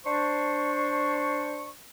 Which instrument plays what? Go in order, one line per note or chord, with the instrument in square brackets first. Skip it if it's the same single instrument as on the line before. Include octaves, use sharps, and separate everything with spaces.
[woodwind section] D4 C5 C#6